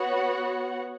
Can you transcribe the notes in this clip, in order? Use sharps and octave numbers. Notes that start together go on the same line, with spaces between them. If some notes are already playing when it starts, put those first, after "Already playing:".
Already playing: B3 F#4 C#5 F#5